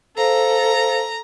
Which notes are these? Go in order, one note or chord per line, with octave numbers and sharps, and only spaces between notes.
A4 C5 F5 A#5